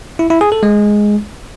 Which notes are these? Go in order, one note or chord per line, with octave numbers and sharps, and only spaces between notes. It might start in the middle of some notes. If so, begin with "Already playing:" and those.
E4
E4
G#4
A4
G#3